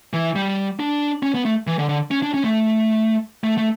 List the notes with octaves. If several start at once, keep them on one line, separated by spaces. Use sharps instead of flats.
E3
G3
D4
C#4
B3
A3
E3
D3
D3
C#4
D4
C#4
A3
A3
A3